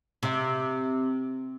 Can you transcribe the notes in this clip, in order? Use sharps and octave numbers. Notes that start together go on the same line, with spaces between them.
C3